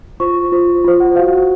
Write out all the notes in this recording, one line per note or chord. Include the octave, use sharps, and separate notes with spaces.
F4 C5 C#6
F4 C5
F4 C5
F#5
F#4 C5 F5